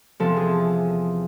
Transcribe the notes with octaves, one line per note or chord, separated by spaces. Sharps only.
E2 C3 F3 A4
G#4